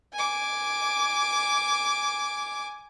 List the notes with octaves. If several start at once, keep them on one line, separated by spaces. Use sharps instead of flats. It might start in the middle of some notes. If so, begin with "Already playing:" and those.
G#5 D6